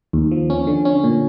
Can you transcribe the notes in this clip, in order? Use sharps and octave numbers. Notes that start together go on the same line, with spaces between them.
D#2
F3
C#4
D3
C#4
A#2